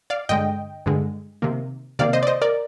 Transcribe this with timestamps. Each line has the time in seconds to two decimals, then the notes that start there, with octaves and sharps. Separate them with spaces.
0.10 D5 F5
0.29 G2 D3 G#3 D#5 G5
0.86 G2 D3 G#3
1.42 C3 D#3 A#3
1.99 C3 D#3 A#3 D5 F5
2.13 C5 D#5
2.23 D5
2.27 C5 D#5
2.42 A#4 D5